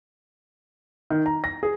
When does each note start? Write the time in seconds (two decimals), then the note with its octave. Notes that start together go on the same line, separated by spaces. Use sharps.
1.10 D#3
1.26 A#5
1.44 A#6
1.63 G#4